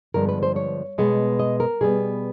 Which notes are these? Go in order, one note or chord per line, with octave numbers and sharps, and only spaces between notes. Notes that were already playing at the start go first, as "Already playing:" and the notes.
G2 D3 F3 G#3 B3 A#4
B4
C5
C#5
B2 G#3 B3
D#5
A#4
B2 G3 B3 G#4